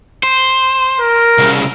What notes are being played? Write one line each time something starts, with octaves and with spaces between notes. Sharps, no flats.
C5
A#4
C2 C#3